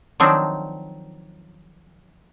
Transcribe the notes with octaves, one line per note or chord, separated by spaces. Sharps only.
D#3 F3 F#3 C4 D4 D#4